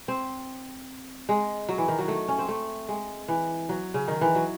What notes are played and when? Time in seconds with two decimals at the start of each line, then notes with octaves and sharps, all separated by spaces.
0.08 C4
1.29 G#3
1.69 F#3
1.78 E3
1.88 D#3
1.99 F#3
2.08 A3
2.28 C#4
2.39 C4
2.49 A3
2.89 G#3
3.28 E3
3.69 F#3
3.94 C#3
4.08 D#3
4.21 E3
4.35 F#3